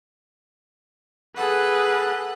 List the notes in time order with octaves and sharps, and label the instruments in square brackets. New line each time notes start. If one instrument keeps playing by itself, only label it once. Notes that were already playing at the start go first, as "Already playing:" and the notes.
[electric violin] G#4 B4 [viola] A4 F#5